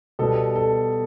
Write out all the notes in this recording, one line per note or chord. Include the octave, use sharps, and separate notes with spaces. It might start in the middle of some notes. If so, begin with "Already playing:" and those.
B2 G3 B3 A4
A4